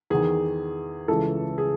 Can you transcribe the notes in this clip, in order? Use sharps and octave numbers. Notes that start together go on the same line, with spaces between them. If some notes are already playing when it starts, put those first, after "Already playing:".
E2 D#3 G#4
C#2 C#3 E3 A4
G#4